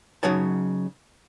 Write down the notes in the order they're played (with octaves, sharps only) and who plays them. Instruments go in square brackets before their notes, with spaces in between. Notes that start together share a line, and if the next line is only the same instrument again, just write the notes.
[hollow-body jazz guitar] C#3 F#3 D#4 C#5 A5